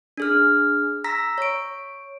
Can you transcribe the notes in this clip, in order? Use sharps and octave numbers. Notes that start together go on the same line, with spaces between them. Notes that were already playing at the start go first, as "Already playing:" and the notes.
D4 G#4 F6
A#5 E6 A#6 B6
C#5 D7